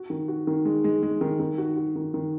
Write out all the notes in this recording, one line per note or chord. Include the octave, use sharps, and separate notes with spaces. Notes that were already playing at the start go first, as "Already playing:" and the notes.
Already playing: F#4
D#3
F#4
D#3
G#3
G#3
G#3
D#3
D#3
F#4
F#4
D#3
D#3